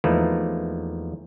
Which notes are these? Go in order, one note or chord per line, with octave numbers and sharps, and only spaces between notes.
E2 F3 A3 A#3 D#4 B4